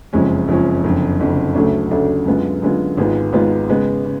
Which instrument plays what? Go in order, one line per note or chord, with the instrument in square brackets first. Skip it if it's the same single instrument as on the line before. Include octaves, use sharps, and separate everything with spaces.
[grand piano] F#1 F2 F3 G#3 C#4
F#1 F2 F3 G#3 C#4
F#1 F2 D3
F#1 F2 D3
D2 C#3 F#3 A3 D4
D2 C#3 F#3 A3 D4
F#2 D3 G#3 B3 F4
F#2 D3 G#3 B3 F4
G#1 G#2 G#3 B3 F4
G#1 G#2 G#3 B3 F4
C#3 G#3 B3
C#3